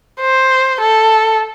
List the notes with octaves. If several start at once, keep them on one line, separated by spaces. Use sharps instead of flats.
C5
A4